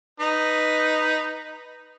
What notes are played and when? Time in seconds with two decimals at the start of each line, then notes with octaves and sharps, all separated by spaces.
0.20 D#4 B4